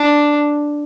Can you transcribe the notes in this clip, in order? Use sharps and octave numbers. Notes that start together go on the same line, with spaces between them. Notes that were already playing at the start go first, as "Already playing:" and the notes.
Already playing: D4